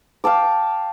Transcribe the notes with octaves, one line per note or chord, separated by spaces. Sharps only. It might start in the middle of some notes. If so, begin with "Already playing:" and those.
F5 G5 A5 D6